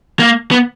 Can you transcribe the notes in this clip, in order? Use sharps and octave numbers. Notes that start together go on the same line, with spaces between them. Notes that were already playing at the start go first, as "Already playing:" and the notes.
A#3
B3